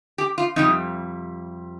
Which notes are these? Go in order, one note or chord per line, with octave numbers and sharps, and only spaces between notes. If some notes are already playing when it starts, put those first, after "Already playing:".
G4
F4
F2 C3 G3 D#4